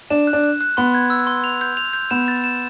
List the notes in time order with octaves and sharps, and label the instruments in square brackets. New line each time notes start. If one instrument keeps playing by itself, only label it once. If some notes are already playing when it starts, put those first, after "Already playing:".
[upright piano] D4 [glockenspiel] E7
[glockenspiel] F#6
[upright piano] D4
[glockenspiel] F#6
F#6
[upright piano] B3 [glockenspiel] C6
[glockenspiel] G#6
E6
C6
F7
G6
F7
G6
[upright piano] B3 [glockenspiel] E7
[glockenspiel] A6
E7